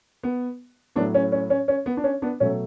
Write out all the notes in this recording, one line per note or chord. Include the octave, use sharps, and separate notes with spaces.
B3
A2 F#3 A3 B3 D4
C#4
C#4
C#4
C#4
B3
D4
C#4
B3 D4
B2 F#3 A3 C#4